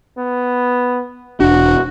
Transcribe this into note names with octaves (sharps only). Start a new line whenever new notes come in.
B3
E1 D4 F#4